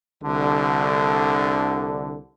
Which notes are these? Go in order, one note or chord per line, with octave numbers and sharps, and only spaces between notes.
C2 D3